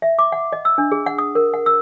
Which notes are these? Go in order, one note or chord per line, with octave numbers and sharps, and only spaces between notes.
E5
D6
F#5
D#5
E6
D4
G#4
F#5
D#6
A#4
F#5
E6